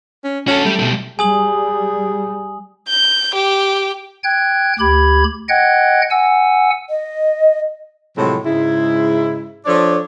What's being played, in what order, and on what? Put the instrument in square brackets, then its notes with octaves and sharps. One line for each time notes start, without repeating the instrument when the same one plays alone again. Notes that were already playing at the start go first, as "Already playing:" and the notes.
[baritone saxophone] C#4
[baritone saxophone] C#4 [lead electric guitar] F#4 A4
[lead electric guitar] G3 [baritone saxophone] A3
[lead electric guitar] B2 G3
[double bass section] G3 [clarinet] G#4 [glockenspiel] G#5 D#6 F#7
[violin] G6
G4
[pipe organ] G5 F#6 G#6
D2 G4 B5 G#6
D#5 F#5 G5 F#6 G#6
F#5 G#5 E6
[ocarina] D#5
[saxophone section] A2 C3 F3 F#3 G#3 C4
G#2 C#3 G#3 E4
F3 D4 A4 C#5 D5